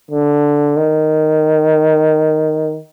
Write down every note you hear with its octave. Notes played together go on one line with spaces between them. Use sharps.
D3
D#3